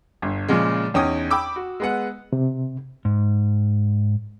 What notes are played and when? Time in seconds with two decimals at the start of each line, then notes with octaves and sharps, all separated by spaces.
0.22 G1
0.48 A#2 C#3 F3 G#3
0.94 E2 C#4 D#4 G5 D#6
1.30 G5 B5 D6 E6
1.56 F#4
1.80 G#3 B3 F#5
2.33 C3
3.05 G#2